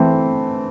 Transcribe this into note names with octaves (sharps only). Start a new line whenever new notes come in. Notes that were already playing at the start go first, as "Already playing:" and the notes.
Already playing: E3 A3 C4